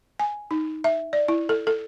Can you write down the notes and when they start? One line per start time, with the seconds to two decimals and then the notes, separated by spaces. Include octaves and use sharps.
0.20 G#5
0.51 D#4
0.84 E5
1.13 D5
1.28 E4
1.49 A4
1.67 A4